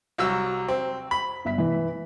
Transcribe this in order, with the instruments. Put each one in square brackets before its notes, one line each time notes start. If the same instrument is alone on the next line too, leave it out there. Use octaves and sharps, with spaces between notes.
[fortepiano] C2 F#3 E6
C4
B5
[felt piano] G1 E5 B6
E3